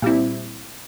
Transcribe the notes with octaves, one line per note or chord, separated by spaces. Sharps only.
A#2 G3 C4 E4